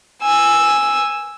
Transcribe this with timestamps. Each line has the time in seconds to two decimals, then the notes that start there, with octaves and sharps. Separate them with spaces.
0.23 G#5 E6